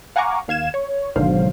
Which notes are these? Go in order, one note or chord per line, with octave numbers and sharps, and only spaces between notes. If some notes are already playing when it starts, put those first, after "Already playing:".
F5 F#5 G#5 A#5 C#6 D6
D#2 F5 G#6 E7
C#5
G#1 B2 D3 F#3 C5 F5